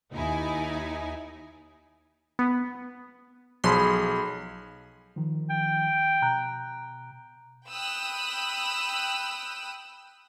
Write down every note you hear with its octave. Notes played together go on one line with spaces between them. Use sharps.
D#2 D#4 E4 G#5
B3
B1 F3 G#4 B5 C6
D#3 F3
G5
B2 A#5 F#6
G5 B5 D#6 E6 F#6